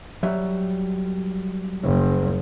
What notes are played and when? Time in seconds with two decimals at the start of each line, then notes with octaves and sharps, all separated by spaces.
0.23 F#3 G3 E5
1.84 F#1